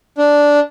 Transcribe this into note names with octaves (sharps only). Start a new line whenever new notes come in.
D4